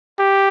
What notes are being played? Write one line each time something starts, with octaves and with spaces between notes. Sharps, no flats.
G4